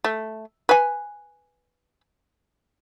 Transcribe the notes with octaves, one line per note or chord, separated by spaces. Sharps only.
A3
B4 G#5